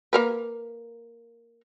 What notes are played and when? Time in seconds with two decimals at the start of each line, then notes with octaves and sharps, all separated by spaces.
0.13 A#3 A#4 B4